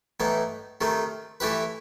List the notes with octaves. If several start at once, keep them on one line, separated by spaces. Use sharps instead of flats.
A2 E3 B3 D#4
C3 D#3 A3 D#4
E3 A3 E4 G4 B4